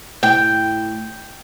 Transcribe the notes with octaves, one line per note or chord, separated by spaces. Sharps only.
A2 G5